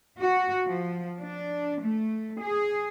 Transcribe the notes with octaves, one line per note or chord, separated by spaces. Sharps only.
F#4
F3
D4
A3
G#4